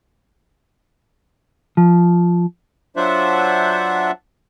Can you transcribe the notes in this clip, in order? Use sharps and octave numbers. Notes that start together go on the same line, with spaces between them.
F3
F#3 D4 F4 C5 E5 F#5